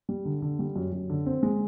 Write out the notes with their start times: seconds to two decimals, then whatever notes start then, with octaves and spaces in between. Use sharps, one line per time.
0.09 G3
0.25 D3
0.42 D3
0.59 G3
0.76 F#2
0.93 F#2
1.10 D3
1.26 C4
1.43 G#3